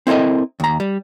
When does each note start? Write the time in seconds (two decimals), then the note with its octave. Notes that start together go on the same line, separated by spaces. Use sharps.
0.07 C4 E4 A4 A#4 D#5
0.60 D#2 A#5
0.80 G3